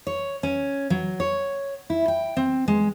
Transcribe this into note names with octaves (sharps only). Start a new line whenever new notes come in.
C#5
C#4
F#3
C#5
E4
G5
C4
G#3